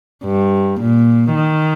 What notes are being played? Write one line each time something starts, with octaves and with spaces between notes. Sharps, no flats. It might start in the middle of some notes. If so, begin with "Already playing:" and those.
G2
A#2
D#3